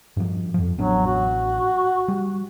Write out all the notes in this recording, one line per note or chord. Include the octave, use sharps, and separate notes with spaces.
G2 F3
F2 F3
A1 F#3 B3 D4
F#4
G3